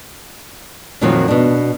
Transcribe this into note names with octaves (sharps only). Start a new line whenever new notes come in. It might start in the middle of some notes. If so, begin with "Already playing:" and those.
F2 A#2 D#3 F3 F#3 C4
B2 D4